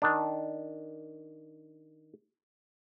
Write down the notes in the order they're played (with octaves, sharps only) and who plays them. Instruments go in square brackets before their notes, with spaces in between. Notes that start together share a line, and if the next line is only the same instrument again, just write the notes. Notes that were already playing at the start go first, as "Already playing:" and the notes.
[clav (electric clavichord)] D#3 D4